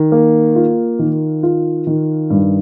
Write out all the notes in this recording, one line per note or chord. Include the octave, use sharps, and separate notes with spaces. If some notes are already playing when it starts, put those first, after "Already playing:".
Already playing: D#3
A#3
F4
D#3
F4
D#3
G2